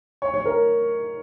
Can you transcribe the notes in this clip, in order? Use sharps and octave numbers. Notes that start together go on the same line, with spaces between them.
C#5
C#5
A#4